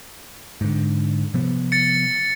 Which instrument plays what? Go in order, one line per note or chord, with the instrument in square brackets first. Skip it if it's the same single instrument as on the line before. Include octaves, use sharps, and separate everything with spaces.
[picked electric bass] G#2 D3
C3 F3 B3
[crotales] A6 C#7